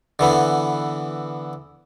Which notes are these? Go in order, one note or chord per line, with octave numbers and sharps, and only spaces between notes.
D3 E3 B3